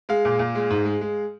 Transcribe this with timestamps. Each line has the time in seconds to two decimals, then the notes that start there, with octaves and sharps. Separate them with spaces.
0.09 G#3 F5
0.25 A#2
0.39 A#2
0.55 G#3
0.70 G#2
0.85 G#3
1.01 G#3